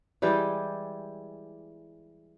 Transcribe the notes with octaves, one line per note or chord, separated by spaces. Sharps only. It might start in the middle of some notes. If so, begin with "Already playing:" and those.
E3 G3 G#3 G4